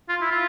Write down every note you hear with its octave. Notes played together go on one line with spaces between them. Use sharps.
F4
E4
F4